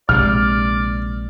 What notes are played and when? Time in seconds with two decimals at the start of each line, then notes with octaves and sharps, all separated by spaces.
0.09 A#1 C3 G#3 D5 F6